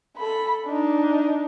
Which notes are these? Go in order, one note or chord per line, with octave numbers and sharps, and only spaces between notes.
A4 B5
D4 D#4